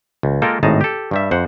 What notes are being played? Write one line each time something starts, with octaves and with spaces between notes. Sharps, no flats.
C#2
G#3 A#3 F4 A4 A#4 G5
G#1 A2 D#4 G#4 A5 A#5
G4 A4
G2 G3 E5
F2 C5 F#5